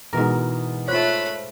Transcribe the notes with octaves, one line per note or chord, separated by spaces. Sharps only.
G#2 B2 E3 B3 A#4
A3 F4 C5 C#5 B5 F#6